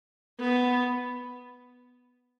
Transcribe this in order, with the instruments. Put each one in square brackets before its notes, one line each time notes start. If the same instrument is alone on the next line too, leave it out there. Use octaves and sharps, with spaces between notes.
[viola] B3